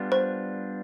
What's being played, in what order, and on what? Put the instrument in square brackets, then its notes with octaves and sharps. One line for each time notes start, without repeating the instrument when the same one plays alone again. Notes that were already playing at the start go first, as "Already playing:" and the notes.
Already playing: [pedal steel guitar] G3 B3 D4 F4
[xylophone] C5